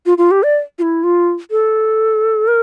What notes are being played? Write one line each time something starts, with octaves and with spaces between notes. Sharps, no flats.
F4
F4
G4
D5
F4
E4
F4
A4
A#4